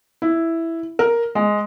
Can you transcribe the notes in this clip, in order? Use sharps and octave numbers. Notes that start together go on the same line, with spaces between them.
E4
A#4
G#3